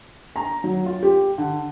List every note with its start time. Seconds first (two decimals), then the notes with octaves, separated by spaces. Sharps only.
0.36 A#5
0.64 F#3
0.86 F4
1.03 G4
1.38 D3